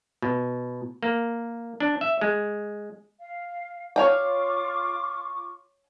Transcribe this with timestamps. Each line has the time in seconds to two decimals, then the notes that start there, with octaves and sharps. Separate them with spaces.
0.22 B2
1.03 A#3
1.80 D4
2.01 E5
2.21 G#3
3.20 F5
3.96 F4 C#5 F5 G5 C#6 D6